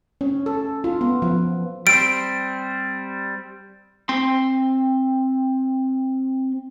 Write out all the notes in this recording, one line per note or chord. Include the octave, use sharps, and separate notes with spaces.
C#4
A4
F4
B3
F3
G3 C4 D7
C4 C6